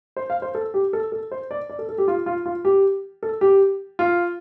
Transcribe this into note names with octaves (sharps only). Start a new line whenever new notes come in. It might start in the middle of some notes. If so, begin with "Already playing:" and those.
C5
F5
C5
A4
G4
A4
A4
C5
D5
D5
A4
A4
G4
F4
F4
F4
G4
A4
G4
F4